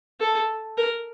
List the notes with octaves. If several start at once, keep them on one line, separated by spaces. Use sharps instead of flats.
A4
A#4